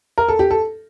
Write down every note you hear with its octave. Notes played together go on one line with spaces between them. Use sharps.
A#4
A4
G4
A4